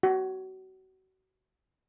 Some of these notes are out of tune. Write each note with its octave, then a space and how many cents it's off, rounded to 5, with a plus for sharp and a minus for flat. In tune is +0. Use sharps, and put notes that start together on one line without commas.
F#4 +30